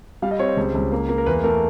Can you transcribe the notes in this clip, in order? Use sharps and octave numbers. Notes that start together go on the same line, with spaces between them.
G3 F5
D#5
C4 C#5
C5
C#2
C#2
A#3
A#3
A#4
E2 B4
A3 A#4